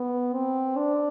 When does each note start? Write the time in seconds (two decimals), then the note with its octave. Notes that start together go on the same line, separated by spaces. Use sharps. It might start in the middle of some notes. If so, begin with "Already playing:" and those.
Already playing: B3
0.34 C4
0.77 D4